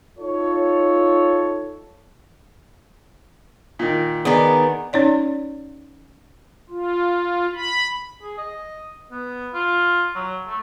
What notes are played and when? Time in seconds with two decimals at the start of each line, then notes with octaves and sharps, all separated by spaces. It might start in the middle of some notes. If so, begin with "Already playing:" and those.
0.19 D#4 F4 A4 C#5
3.79 A#2 D#3
4.25 D#3 B3 D#4 G#4 D5
4.93 C#4 D#4 C#5 D5
6.70 F4
7.55 B5
8.22 G#4
8.38 D#5
9.12 B3
9.53 F4
10.15 F#3
10.47 A3